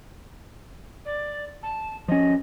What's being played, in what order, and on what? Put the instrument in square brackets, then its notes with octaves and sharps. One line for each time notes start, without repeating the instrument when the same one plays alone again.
[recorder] D5
A5
[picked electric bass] F3 C#4 [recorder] D#5